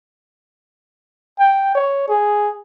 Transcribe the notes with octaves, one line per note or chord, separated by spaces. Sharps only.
G5
C#5
G#4